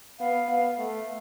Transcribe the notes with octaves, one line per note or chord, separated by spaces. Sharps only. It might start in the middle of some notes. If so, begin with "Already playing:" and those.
B3 F5
B3
A3